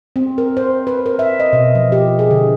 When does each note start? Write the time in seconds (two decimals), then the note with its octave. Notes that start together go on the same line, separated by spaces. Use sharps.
0.16 C4
0.38 A#4
0.57 C5
0.87 B4
1.06 A#4
1.19 E5
1.40 D#5
1.53 B2
1.75 F3
1.92 G4
2.19 G#4
2.31 D3